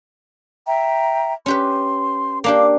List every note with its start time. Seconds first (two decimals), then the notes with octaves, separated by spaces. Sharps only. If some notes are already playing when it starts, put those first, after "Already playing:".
0.67 E5 G5 A#5
1.46 C#4 G4 B4 C6
2.44 A#3 D4 G4 F5 D6